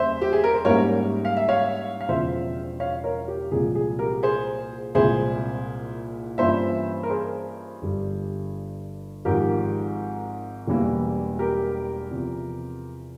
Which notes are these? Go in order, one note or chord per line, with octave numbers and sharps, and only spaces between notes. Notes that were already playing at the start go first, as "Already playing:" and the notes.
Already playing: E2 C#3 G3 A#3 C5 E5
G4
G#4
A#4
C5
G#2 G3 A#3 C#4 E4 A#4 C#5
F5
E5
C#5 F5
F5
E1 E2 C#3 F3 C5 E5
C#5 F5
A#4 C#5
G4
C2 A#2 F3 G#3 G#4
G#4
G4 A#4
G#4 C5
C2 A#2 G#3 E4 G#4 C5
G2 E3 A#3 C#4 F4 C5 E5
A#4
G#4 C5
G1 G2 G3
G#1 G#2 F3 G4 A#4
E1 E2 E3 G3 A#3
G4 A#4
E2 C3 F3